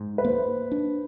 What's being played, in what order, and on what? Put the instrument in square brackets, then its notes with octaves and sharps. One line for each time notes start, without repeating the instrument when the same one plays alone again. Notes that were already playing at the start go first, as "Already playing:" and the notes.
Already playing: [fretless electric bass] G#2
[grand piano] B4
[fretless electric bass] A#3 [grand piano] C5
[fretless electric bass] D4